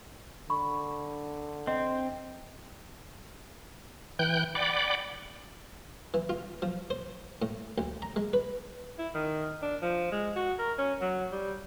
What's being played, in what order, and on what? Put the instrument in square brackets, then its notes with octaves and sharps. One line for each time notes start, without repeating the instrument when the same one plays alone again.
[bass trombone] D3 [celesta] B5 C#6
[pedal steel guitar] C4 [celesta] D#5
[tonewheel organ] E3 G5 F#6 G6
D5 F#5 G5 B5 D6
[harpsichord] E3
F4
F3
C5
A2
D2
A#5
G#3
B4
[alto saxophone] E4
D#3
D4
F3
G#3
F#4
A#4
C#4
F#3
G3